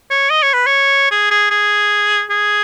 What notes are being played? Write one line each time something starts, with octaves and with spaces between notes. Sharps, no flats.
C#5
D#5
C#5
B4
C#5
G#4
G#4
G#4
G#4